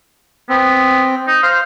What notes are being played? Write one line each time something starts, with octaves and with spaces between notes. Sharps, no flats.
B3 C4
D#4
C5 F5